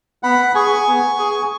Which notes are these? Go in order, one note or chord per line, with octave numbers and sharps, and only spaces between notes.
B3 F#5 B5
G#4 G#5 C#6
B3
G#4